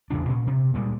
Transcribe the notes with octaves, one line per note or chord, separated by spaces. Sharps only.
A1 E2 C#3 D4
A#2 C#4
C3
D2 A#2 G3 G#3